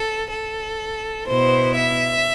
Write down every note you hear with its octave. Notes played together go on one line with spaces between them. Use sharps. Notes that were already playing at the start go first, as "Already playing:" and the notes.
Already playing: A4
A4
B2 B3 E4 C5
E5